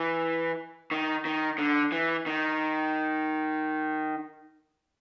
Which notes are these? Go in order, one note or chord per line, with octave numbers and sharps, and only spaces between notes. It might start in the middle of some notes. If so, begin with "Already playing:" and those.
Already playing: E3
D#3
D#3
D3
E3
D#3